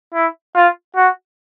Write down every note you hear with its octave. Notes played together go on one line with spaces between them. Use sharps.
E4
F4
F#4